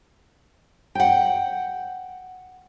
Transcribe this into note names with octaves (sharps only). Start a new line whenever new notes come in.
F#5 G5